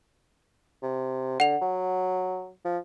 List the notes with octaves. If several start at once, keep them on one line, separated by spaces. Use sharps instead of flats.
C3
D3 F#5 F7
F#3
F3